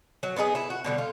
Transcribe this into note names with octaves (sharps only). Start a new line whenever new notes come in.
F#3
B3 D#4 E4 G#4
B3 E4
F#4
B2 D3 G3
F4